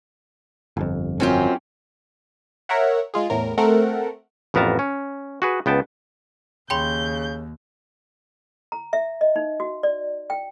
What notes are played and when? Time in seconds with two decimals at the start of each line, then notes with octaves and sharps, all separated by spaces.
0.77 G1 F2
1.20 F#2 C4 C#4 D#4 F4 G4
2.69 A#4 C#5 E5 F#5
3.14 G#3 F4 G#4
3.30 E2 A2 A#4
3.58 A3 C4 A4 A#4 F#5
4.54 A1 F2 B3 A#4 A5 A#5
4.79 C#4
5.42 F#4 G#4 B4
5.66 C#2 B3 G5 A5
6.70 D#2 C#3 G5 B5 C6 G6
8.72 A#5
8.93 E5
9.21 D#5
9.36 D#4
9.60 F#4
9.83 D5
10.30 G5